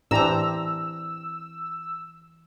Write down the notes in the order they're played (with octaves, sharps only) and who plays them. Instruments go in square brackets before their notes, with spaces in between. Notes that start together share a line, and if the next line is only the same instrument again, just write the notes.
[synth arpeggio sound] A2 [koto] E3 C4 [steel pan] D4 G4 A#5 [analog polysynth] E6